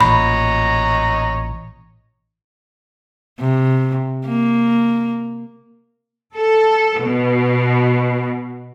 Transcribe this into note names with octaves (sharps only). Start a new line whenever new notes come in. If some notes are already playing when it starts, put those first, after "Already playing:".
A1 A#2 C#5 D#5 A#5 B5
C3
A#3
A4
B2